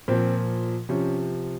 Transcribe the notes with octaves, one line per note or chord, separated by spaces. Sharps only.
A#2 F3 C4
C3 F3 C#4